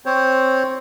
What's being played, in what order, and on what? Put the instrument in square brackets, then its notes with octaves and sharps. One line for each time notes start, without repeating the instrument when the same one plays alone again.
[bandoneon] C4 C5 C#5